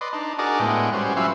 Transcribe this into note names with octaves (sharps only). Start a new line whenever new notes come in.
B4 D5 D#5 C6
D4 D#4
D4 F#4 G#4 A#4 D5 D#5
A2 G#3 B3 G5
G3 C#4 F#4 C5
F#3 C#4 F4 B4 C5 E5